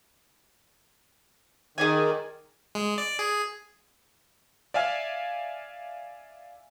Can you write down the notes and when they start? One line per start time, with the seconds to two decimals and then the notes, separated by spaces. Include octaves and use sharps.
1.78 D#3 G#4 D5 G#5
2.75 G#3
2.98 D5
3.19 G#4
4.74 D5 E5 F5 G#5 F6